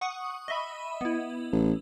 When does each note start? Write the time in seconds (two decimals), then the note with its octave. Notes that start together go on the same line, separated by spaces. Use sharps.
0.01 F#5 C#6 D#6
0.48 D#5 E5 B5
1.01 B3 E4
1.52 A1